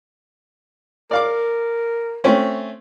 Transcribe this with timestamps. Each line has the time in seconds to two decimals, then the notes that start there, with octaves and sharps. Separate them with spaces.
1.11 A#4 D5 F5 D6
2.24 A3 C4 C#4